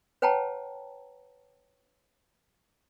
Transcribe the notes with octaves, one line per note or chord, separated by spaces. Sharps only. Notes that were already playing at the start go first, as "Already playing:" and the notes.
B4 C#5 F#5 G5 A5 A#5